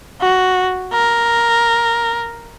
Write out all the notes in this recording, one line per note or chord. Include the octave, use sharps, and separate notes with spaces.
F#4
A#4